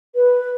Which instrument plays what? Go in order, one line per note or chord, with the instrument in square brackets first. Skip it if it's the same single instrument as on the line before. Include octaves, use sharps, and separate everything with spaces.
[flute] B4